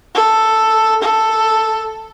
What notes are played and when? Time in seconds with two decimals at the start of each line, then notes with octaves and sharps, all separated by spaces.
0.14 A4
1.02 A4